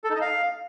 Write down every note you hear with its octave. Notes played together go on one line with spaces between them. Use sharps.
A4
D#4
D#5
F5